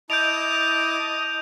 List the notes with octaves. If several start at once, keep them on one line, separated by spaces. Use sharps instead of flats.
E4 D#5 A5 D6 G6 D7 F7